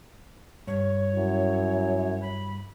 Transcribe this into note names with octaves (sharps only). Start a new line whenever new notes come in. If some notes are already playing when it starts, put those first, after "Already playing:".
G2 C#5
F#2 E4
B5